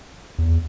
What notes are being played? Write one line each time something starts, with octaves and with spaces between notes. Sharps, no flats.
E2